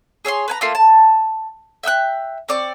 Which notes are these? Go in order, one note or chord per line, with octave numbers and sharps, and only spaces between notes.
G#4 C#5 E5 C6
B4 G#5 A#5
A3 A#3 F4 C6
A5
E5 G5 E6 F#6
C4 D5 C#6